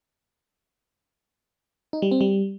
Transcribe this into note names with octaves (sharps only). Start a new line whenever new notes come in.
D#4
G3
C4
G3